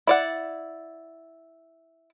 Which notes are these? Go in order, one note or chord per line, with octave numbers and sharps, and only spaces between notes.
E4 D5 F#5